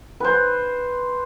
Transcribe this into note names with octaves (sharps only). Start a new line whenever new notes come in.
B4 C5